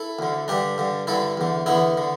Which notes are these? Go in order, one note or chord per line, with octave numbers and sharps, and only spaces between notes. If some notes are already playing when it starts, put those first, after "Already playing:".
Already playing: E4 A4
D2 D3
G2 D3 D4 G4
G2 D3
G2 D3 E4 A4
E2 D3
E2 D3 B3 E4
D3